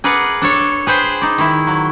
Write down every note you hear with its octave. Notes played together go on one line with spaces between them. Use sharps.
G#4 A#4 B4 D5 F#5
D4 A4 C#5
G#4 B4 C5 G5
D#4 D5
D#3 E4
F#3